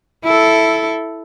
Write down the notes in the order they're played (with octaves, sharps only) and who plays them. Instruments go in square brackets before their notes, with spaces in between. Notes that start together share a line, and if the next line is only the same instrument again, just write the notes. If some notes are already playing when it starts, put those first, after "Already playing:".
[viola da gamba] E4 A4